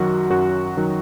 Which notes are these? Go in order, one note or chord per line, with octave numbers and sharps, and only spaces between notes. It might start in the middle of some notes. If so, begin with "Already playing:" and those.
Already playing: F#2 D#3 F#3 F#4
F#2 F#4
D#3 F#3